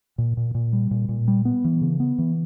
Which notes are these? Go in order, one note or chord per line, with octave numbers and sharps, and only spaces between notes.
A#2
A#2
A#2
G3
A#2
A#2
G3
B3
E3
C#3
B3
E3